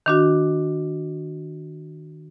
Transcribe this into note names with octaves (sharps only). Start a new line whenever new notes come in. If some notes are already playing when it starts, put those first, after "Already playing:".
D#3 D4 F#4